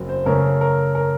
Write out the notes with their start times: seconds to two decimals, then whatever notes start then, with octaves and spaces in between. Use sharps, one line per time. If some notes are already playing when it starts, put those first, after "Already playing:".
Already playing: F#1 F#3 C4
0.09 C5
0.26 F#2 C#3 A3 C#4 A#4
0.61 A#4
0.95 A#4